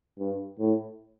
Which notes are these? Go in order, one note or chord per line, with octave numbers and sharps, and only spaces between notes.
G2
A2